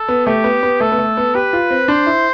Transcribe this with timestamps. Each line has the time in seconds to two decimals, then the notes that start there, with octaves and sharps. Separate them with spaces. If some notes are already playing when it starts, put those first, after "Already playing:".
Already playing: A4
0.09 B3
0.27 A3 G4
0.44 B3
0.63 B3
0.80 A3 A4
0.92 B3
0.98 A3
1.17 B3
1.35 G4 B4
1.53 F4
1.70 C4
1.88 D4 C5
2.06 E4